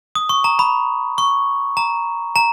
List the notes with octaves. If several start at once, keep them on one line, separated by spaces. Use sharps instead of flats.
D#6
C#6
A#5
B5
C#6
A#5
A#5